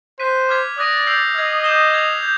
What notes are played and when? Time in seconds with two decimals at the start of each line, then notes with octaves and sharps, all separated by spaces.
0.20 C5 F#6 B6 D#7
0.49 D6 F6 G#6 B6
0.78 D5 D#6 F#6 A#6 D#7
1.07 E6 G6 C7 F7
1.35 D#5 F6 G#6 C7
1.64 D6 G6 C7 E7 G7
1.93 G#6 C7 F7
2.23 G6